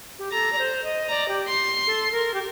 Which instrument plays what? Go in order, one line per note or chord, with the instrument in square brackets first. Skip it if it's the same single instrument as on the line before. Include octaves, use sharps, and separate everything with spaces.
[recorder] G4
[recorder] A4 [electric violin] A#5
[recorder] D5
C5
D#5
[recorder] D5 [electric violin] A#5
[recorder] G4
[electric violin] C6
[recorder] A4
A#4
G4